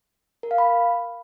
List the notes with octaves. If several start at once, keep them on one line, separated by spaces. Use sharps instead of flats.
A#4
F5
B5